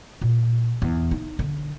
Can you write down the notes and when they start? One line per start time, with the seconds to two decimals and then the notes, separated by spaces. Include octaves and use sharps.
0.21 A#2
0.82 E2
1.11 D#4
1.39 D3